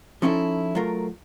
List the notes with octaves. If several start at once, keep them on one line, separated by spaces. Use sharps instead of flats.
F3 C#4 D#4 E4 A4
F#3 A3 F4 A#4